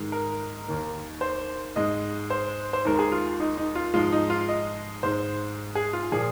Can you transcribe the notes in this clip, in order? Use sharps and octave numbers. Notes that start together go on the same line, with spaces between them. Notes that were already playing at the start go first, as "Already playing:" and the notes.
Already playing: G#2 D#3 G#3
A#4
D#2 D#3 A#3
C5
G#2 G#3 D#5
C5
C5
D#2 D#3 G#3 A#4
G#4
F4
D#4
D#4
F4
G#2 F3 G#3 F4
D#4
F4
D#5
G#2 G#3 C5
G#4
F4
A#2 F3 A#3 G#4